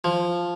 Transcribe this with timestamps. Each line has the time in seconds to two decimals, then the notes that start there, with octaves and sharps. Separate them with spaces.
0.04 F3